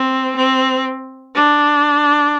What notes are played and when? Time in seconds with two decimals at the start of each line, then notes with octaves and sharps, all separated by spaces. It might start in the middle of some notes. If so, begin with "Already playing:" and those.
Already playing: C4
0.37 C4
1.35 D4